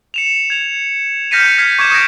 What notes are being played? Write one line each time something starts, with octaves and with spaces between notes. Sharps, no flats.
C#7 E7 F7
G#6 F7
F6 G6 A#6 B6 C#7 D#7
F6 G#6 B6 C7
C#6 D6 G#6 C#7 E7
D#6 G#6 A#6 D7